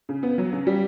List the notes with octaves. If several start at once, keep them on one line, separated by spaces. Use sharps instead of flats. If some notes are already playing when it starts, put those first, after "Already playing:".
C#3
B3
F#3
C#3
G3